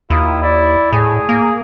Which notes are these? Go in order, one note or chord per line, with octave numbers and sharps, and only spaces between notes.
D#2 E4 F4 D#6
E4 D5
A2 G#4
A#3